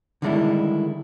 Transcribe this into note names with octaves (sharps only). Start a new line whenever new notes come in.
D3 D#3 G3 G#3 D4 E4